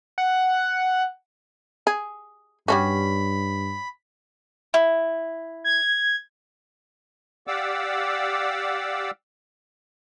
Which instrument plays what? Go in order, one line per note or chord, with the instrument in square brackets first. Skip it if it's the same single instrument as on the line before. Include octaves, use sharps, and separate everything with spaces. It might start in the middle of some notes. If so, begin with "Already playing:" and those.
[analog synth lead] F#5
[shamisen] G#4
[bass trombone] G2 [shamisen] G3 C#4 F#4 [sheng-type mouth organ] B5
[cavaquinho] E4
[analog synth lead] G#6
[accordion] G4 D5 F5 F#5 D6 E6